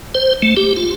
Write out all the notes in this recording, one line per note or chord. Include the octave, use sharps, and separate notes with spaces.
C5
A3
G4
F4